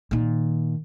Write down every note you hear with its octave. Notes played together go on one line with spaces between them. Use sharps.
A#2 D#3